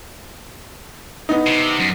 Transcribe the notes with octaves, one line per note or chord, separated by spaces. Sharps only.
B3 D#4
C3
F#2